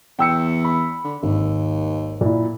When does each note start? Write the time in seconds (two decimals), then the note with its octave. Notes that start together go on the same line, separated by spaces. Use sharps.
0.19 E2 G5 E6 C#7
0.64 B5
1.04 D3
1.23 G#1 D#2
2.21 A#2 E4